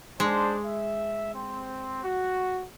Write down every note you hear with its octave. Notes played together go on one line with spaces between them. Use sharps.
G#3 D4 C5
E5
C4
F#4